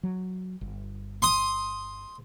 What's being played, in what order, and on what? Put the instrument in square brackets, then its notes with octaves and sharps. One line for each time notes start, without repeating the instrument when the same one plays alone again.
[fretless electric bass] F#3
G1
[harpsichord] C6 D#6